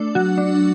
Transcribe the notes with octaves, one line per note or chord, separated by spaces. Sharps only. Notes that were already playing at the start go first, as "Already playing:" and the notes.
Already playing: A3 D4
F#3 F#4
D4